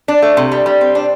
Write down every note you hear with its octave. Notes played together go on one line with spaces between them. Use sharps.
D4
A3
C3
G3
G3
C4
D4